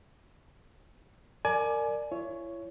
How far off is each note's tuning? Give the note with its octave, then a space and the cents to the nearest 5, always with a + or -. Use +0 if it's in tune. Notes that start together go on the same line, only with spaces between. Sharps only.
A#4 -20 D5 +10 G#5 +25
E4 +40 C#5 +0